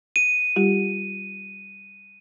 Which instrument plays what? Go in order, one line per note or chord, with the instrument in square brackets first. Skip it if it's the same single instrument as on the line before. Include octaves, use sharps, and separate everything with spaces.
[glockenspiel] D#7
[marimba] G3 F4 G4